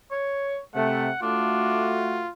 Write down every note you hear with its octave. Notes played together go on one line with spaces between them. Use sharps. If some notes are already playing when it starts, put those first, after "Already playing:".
C#5
C3 A3 F#5
A3 D4 F4 F#4